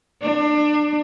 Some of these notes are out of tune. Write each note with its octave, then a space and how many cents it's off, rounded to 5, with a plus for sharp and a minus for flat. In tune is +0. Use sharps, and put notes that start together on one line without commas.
D4 +30